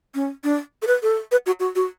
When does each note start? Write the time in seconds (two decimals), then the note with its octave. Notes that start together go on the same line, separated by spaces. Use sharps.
0.15 C#4
0.44 D4
0.82 A4
0.87 B4
1.03 A4
1.31 B4
1.46 F#4
1.60 F#4
1.75 F#4